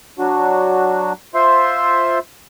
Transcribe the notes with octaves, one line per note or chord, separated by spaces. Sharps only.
F#3 D4 F#4
F4 C5 E5 C6